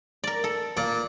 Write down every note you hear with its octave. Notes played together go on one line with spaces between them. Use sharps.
A#4 D5
A4
A#2 D5